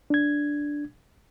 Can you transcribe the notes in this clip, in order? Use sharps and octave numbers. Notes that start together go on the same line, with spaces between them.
D4 G#6